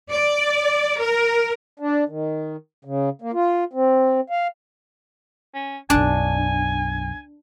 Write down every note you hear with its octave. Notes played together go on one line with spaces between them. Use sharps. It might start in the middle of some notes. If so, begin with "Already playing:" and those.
D5
A#4
D4
D#3
C#3
A#3
F4
C4
F5
C#4
B1 F#2 D4 G#5